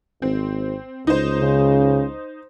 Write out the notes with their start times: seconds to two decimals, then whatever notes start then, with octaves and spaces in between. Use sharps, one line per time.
0.22 G#1 C4
1.07 C#2 D#4 C5
1.40 C#3